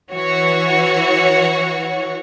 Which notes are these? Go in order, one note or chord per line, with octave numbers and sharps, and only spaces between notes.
E3 F#4 C#5